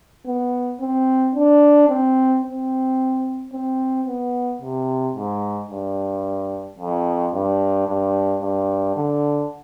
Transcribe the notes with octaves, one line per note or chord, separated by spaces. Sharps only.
B3
C4
D4
C4
C4
C4
B3
C3
G#2
G2
F2
G2
G2
G2
D3